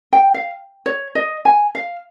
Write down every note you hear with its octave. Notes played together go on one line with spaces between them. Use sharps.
G5
F5
C#5
D#5
G#5
F5